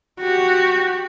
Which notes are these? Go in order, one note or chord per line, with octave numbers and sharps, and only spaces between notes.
F#4 G4